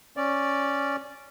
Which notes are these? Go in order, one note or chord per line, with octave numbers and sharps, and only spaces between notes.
C#4 D5